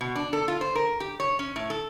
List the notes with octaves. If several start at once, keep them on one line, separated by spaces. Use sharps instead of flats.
B2
D4
A4
F4
C5
A#4
G4
C#5
C#4
A2
A4